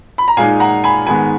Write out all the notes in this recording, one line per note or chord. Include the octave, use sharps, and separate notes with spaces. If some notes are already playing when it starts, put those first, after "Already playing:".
B5
A#5
A#2 G#3 D#4 F5 G#5
F#5 A#5
G#5 B5
G#2 D#3 G#3 B3 G#5 B5